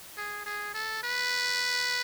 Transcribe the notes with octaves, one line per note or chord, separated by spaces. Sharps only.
G#4
G#4
A4
B4